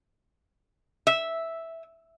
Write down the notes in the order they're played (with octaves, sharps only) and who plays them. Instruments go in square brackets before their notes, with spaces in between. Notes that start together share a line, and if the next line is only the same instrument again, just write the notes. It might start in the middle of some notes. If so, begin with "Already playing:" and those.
[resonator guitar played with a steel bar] E5